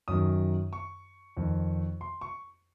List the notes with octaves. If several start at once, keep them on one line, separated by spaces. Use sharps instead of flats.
F#2 D#3 D#6
C#6
F2 D#3
C6
C#6